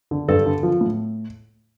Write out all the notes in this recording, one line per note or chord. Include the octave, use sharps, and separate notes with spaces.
D3
G2 A4
D3
F3
A2